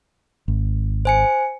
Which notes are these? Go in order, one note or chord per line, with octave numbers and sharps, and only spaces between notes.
G#1
C5 G#5 C#7